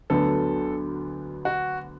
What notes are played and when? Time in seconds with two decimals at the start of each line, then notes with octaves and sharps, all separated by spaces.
0.10 D2 D3 F#3 B3 A4
1.45 F#4